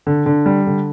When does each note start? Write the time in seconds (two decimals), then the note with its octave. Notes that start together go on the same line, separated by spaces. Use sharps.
0.07 D3
0.26 D3
0.46 G3
0.67 D3